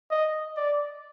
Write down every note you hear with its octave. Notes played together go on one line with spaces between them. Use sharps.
D#5
D5